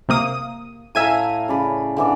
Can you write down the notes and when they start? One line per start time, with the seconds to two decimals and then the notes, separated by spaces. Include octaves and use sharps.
0.09 C3 A#3 D#6
0.95 A2 E5 F5 G#5 A#5 D#7
1.48 C#3 D5 B5
1.97 D3 E3 D5